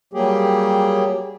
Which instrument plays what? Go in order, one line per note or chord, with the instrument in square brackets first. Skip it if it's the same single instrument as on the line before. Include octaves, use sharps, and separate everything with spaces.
[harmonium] F#3 G3 A#3 G4 G#4